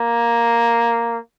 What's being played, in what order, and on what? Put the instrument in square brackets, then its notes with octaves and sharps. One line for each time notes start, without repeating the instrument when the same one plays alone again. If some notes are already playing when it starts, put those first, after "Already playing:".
Already playing: [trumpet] A#3